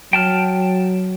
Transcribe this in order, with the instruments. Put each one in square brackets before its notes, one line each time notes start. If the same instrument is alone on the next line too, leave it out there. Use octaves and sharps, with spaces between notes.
[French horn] F#3 [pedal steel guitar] G5 A5 F6